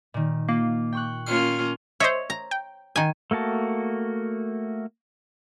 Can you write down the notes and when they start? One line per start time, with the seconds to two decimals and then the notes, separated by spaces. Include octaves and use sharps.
0.14 A#2 D#3
0.49 A#3 F4
0.92 G5 C#6 F#6
1.26 A#3 C#4 F4 F6
2.00 C5 C#5 D#5 E5
2.30 A#5
2.51 G5
2.96 D#3 G#5
3.31 A3 A#3 F#4 A5